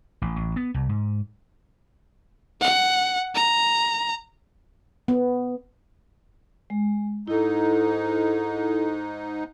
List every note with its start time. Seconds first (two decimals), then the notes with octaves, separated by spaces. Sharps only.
0.22 A1
0.36 A1
0.56 B3
0.74 C2
0.89 G#2
2.61 F#5
3.35 A#5
5.08 B3
6.70 G#3
7.28 G#2 D#4 E4 A4